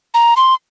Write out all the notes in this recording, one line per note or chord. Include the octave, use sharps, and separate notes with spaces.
A#5
C6